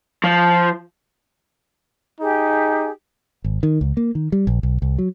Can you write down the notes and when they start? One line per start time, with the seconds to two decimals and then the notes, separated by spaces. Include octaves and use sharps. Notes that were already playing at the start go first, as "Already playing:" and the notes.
0.24 F3
2.20 D#4 G4 G#4
3.44 G#1
3.63 D#3
3.81 C#2
3.97 A#3
4.15 D#3
4.32 G3
4.47 A#1
4.63 B1
4.82 C2
4.98 F#3